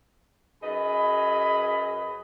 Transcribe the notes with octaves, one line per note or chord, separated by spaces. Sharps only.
F#2 G#4 B4 D#5 B5